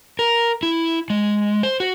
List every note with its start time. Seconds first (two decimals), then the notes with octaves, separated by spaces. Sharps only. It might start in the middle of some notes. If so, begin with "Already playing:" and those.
0.19 A#4
0.63 E4
1.10 G#3
1.63 C5
1.80 F#4